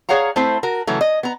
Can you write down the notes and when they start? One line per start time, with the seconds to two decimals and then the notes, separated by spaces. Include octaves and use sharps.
0.09 G#4 C#5 F5 F#5 A#5
0.36 A3 C4 E4 C5
0.63 F#4 A#4
0.87 C#3 E3 F#3 A3
1.01 D#5
1.23 B3 A#5